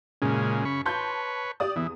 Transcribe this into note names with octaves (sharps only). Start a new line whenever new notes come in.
F#2 A#2 C#3 G#3
C#3 B5 C#6
B4 C#5 A5 C6 G6
G4 D5 D#6
E2 E3